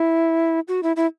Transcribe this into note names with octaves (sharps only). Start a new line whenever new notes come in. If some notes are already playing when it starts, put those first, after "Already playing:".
Already playing: E4
F#4
E4
E4